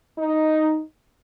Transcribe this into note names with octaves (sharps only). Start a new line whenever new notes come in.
D#4